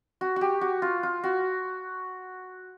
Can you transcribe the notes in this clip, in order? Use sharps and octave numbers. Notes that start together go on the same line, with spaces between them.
F#4
F#4 G4
F#4
F4
F4
F#4